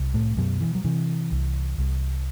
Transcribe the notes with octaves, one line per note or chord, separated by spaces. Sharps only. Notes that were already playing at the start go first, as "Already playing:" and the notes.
Already playing: C2
A2 A3
F#2 B2 F#3
E3
F#3
C3 E3
C2
C2